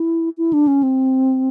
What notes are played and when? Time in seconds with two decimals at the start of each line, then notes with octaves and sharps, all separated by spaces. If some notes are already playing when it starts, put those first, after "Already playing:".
Already playing: E4
0.38 E4
0.53 D4
0.67 C#4
0.83 C4